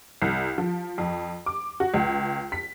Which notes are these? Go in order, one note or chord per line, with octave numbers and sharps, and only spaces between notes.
C2
F3
F2
D6
F#4
C#2
B6